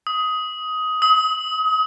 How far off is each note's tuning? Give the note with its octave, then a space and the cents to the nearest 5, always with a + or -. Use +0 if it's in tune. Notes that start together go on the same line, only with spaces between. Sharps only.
D#6 +15
D#6 +35